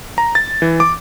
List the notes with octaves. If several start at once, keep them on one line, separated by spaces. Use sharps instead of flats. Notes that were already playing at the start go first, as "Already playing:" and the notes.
A#5
A6
E3
D6